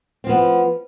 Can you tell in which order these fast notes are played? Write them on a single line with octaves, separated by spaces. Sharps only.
C4 F3 B3